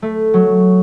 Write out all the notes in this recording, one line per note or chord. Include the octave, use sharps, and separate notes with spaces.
A3
F#3